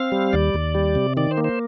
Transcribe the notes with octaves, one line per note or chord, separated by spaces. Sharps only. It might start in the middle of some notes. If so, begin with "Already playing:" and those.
Already playing: C4 F5
G3
D#2 D5
D#2
G3
C3
D#3 D5
C5
A#3
C5